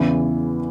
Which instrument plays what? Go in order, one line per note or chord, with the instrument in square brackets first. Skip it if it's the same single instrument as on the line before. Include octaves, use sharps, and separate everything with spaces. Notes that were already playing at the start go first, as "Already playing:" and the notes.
Already playing: [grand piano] E2 C#3 E3